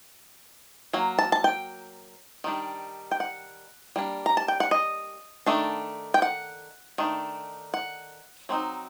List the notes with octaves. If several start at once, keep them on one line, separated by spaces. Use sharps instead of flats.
F#3 A#3
A5
A5
G5
D#3 G3 D4
G5
F#5
G3 A#3 D4
A#5
A5
G5
F#5
D#5
D#3 A3 D4
G5
F#5
D#3 A3 D4
F#5
F#3 C4 D#4